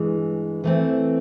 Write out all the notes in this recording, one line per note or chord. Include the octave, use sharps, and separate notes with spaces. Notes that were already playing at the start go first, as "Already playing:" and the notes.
Already playing: G2 E3 G#3
E3 A3 C4